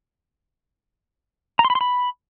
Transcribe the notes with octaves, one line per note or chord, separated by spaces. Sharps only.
A#5
C6
B5
C6
B5